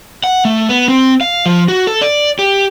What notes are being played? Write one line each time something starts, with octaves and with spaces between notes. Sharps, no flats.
F#5
A3
B3
C4
F5
F3
F#4
A4
D5
G4